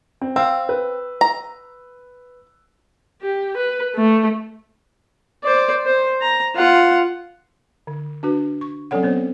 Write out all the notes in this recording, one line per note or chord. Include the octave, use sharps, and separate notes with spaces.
C4
C4 F5 E6
B4
A#5
G4
B4
A3
C5 D5
C5
A#5
F4 F#5
D3
D4 F#4 B4
C#6
F#3 C4 C#4 A4 C#5 F#5
B3 C4 C5 C#5